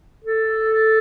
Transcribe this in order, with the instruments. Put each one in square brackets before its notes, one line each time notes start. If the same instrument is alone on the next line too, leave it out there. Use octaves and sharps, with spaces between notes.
[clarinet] A4